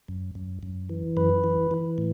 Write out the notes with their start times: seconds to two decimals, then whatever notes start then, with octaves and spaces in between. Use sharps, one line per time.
0.08 F#2
0.35 F#2
0.63 F#2
0.89 E3
1.17 F#2 B4
1.44 E3
1.71 E3
1.98 A2